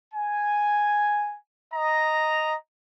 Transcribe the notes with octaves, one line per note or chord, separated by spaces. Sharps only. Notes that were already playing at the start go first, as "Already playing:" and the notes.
G#5
D#5 A#5